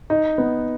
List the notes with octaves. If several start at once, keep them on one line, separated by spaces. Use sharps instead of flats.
D#4
B3